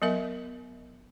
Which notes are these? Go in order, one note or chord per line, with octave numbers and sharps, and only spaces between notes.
F#3 B3 A#4 E5